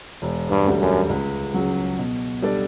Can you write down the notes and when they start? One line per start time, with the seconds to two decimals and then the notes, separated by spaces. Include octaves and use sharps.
0.22 E1
0.50 G2
0.66 D2 D3 G3
0.80 F#2
1.10 C#2
1.54 C#3 F#3
1.99 B2
2.42 G3 D4 A4 D5